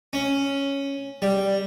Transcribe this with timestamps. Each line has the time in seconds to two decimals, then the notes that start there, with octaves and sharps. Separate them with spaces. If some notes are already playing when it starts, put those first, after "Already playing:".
0.13 C#4
1.22 G3